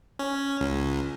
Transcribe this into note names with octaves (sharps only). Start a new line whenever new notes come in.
C#4
C#2